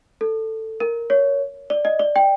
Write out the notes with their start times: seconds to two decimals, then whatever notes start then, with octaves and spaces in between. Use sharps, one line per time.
0.21 A4
0.80 A#4
1.10 C#5
1.70 D5
1.85 D#5
1.99 D5
2.16 G5